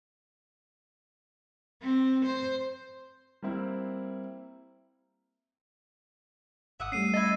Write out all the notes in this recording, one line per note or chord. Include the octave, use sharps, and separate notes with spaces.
C4
C5
G3 A#3 C4 E4
G#1 E5 F#5 D#6
G3 A3 C#4 C7 D#7
E4 A4 D#5 A6